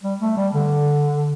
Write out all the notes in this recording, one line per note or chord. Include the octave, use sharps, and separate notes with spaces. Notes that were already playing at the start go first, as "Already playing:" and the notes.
G3
A3
G3
D3